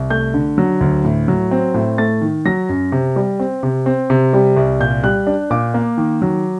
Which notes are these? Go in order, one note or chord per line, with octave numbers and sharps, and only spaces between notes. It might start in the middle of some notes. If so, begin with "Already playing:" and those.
Already playing: C2
A3 G6
D3
F#3
D2
A2
F#3
C4
A2
A3 A6
D#3
F#3 A#6
F#2
C3
G3
C4
C3
C4
C3
G3
C2
A#2 G6
G3 F#6
D4
A#2 D6
A#3
D#3
F#3